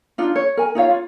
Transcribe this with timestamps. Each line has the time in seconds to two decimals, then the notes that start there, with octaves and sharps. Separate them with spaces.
0.18 D4 D#4 F4
0.36 C#5
0.57 A#4 G#5
0.75 D#4 F4 C#5 F5
0.90 F4